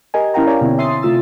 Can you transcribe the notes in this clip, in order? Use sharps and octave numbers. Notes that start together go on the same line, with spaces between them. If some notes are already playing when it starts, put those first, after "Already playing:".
G4 A#4 D#5 G#5
C#4 E4 A#4 F5 G5 A#5
C#5 D5 G5 G#5 A#5
B2 D3 C4 E4
E5 C6 D#6 A6 C7
C3 A3 F4 E6 A6